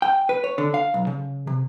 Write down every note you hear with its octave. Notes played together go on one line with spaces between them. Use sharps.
G5
B4
C#5
D3
F5
B1
C#3
C3